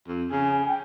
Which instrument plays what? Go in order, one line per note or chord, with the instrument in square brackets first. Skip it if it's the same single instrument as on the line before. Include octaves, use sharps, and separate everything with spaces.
[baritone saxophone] F2
[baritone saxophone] C#3 [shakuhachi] G#5
[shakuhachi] G5